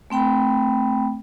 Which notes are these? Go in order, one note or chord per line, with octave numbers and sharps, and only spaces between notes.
A3 C4 G5 B5